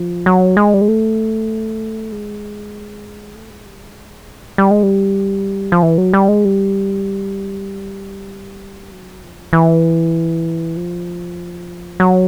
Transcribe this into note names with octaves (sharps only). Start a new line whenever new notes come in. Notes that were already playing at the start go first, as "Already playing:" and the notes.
Already playing: F3
F#3
G#3
G3
G#3
A3
G#3
A3
G#3
G3
G#3
G3
G#3
G3
F3
E3
F#3
G3
G#3
G3
F#3
F3
E3
F3
F#3